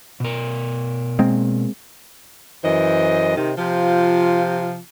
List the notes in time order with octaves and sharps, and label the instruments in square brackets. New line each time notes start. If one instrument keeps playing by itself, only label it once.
[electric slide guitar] B2 A#4
[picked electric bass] G#3 A#3 C4
[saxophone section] F#2 E3 C5 D#5
C3 D#3
C3 F3 F4